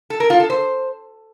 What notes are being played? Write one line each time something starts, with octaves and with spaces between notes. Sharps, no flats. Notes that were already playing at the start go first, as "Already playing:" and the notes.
A4
A#4
F4
A4
C5